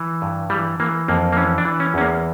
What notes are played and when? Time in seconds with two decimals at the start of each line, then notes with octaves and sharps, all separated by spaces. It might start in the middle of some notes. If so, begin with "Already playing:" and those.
Already playing: E3
0.22 G2
0.50 E3 G3
0.80 E3 A#3
1.08 F2 A#3
1.33 A#3
1.36 E3 C#4
1.58 D4
1.65 E3
1.80 C#4
1.94 E2 C#4
2.01 A#3